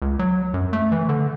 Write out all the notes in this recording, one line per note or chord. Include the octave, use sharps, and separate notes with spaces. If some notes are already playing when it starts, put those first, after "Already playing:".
C#2
F#3
F#2
A3
E3
D3